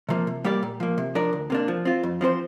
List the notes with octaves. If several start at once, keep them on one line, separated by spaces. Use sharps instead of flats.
C3 F3 A#3
C3
G3 A#3 G4 D5
A#2
F3 A#3
C3
F3 D4 A#4 D5
D2
C3 A#3 D4
F3
C4 F4
F2
F3 C4 G4 C5